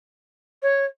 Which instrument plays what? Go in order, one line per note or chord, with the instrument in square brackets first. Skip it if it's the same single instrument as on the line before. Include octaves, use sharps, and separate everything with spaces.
[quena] C#5